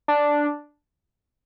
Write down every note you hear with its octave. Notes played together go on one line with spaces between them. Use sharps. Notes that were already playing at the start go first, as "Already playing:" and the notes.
D4